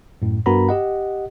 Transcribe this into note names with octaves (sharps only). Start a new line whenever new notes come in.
F#2 A2
G2 B3 F#4 A#4 A#5 B5
G4 D#5 F#5